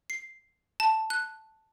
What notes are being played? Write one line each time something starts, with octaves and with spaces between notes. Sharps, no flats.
C7
A5
F#6